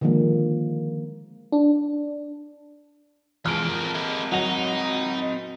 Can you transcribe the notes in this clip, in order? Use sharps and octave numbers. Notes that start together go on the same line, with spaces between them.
D3 D#3 F3 G#3 A#3
D4
E3 G#3 F4 A4 F6 D7
C4 A#4
G#3 G4
F#3 D#4 F#4 F7